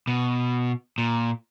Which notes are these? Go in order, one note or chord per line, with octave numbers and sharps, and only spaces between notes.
B2
A#2